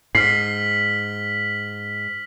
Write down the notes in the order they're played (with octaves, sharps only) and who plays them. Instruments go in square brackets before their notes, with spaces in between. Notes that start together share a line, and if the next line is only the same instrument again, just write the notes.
[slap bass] G#2 [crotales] F6 B6 F#7 [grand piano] C7